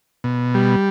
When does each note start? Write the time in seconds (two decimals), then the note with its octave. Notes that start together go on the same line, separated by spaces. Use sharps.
0.24 B2
0.54 G3